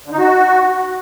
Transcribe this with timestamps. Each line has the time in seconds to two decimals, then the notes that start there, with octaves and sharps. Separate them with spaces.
0.06 D3
0.12 D#4
0.18 F#4